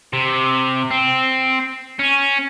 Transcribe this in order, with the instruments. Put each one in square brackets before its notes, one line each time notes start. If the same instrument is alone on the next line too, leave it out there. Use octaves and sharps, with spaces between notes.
[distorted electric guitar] C3
C4
C#4